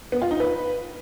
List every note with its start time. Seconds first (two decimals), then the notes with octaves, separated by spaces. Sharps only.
0.12 B3
0.22 F4
0.31 D#4
0.40 B4